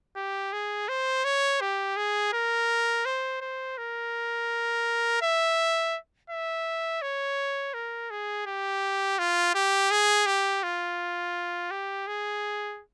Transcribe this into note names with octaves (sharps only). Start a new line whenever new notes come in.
G4
G#4
C5
C#5
G4
G#4
A#4
C5
C5
A#4
E5
E5
C#5
A#4
G#4
G4
F4
G4
G#4
G4
F4
G4
G#4